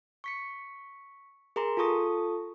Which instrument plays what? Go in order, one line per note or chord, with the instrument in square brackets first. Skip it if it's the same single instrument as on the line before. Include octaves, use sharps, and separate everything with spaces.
[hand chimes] C#6 B6 C#7
G#4 A#4 A#5 C6
F4 A4 A5 C#6 D#6 A#6